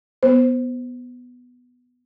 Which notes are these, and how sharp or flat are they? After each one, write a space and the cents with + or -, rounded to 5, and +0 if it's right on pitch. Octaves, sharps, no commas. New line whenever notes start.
B3 +0 C5 +0